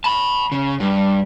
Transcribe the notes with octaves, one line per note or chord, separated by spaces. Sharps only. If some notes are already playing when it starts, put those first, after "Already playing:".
A5 B5
C#3
G2